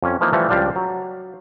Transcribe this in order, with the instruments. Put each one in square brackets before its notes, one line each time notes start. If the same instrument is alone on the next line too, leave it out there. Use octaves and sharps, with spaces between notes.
[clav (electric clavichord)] F2 C#4
E3 F3 A#3 D#4
E3 F3 G3 A3
C#2 F3 G3 D4 F5
F#3